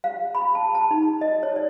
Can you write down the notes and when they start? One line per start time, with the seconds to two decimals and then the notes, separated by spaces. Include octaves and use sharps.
0.04 F5
0.35 B5
0.55 A5
0.75 A5
0.91 D#4
1.21 D#5
1.43 C#5
1.56 D5